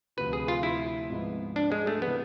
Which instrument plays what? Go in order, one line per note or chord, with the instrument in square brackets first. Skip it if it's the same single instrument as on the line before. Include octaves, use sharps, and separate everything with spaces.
[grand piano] D2 C3 F3 [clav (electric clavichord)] B4
[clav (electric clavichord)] G#4
F4
E4
[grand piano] G#2 F3 G#3 B3
[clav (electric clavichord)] D4
G#3
A3
[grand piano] C3 E3 [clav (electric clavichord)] B3